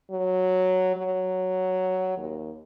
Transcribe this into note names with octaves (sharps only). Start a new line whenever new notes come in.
F#3
F#3
D#2